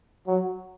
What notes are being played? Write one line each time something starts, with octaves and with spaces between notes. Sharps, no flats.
F#3